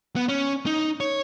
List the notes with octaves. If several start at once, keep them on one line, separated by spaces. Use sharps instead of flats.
B3
C#4
D#4
C#5